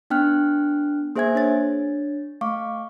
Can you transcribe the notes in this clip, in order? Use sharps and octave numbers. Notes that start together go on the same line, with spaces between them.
B3 D4 G5 F6 F#6
A#3 G#4 C5 E5 G#5 G#6
D4 C#5 A6
A3 F5 C#6 D6